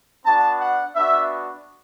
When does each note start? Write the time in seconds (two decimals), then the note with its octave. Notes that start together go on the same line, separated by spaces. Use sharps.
0.24 B3 D4 F#4 A5
0.60 F#5
0.95 B3 D4 F#4 E5